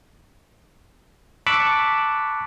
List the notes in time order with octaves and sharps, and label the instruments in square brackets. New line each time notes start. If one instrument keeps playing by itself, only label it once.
[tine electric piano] A5 B5 C#6 D6 E6 F#6